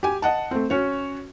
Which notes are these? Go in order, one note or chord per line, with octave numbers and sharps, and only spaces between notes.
G4 G#5
D#5 F#5 A5
A3 C4
C#4 F#4 C#5